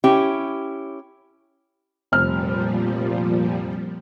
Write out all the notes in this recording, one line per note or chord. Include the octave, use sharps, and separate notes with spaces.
C#4 E4 G4
F1 A#2 F3 G3 F6